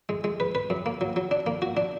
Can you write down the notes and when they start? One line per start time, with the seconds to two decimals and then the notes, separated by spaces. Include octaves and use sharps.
0.09 G#3
0.24 G#3
0.40 B4
0.55 B4
0.70 F#2
0.86 A#3
1.01 F#3
1.16 F#3
1.31 D4
1.47 A#3
1.62 F#4
1.77 D4